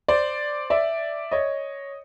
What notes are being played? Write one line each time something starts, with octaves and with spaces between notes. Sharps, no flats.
C5 D5
D5 E5
C#5 D#5